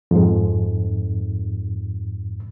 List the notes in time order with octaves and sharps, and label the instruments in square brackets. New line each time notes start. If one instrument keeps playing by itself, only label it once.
[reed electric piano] F2 G#2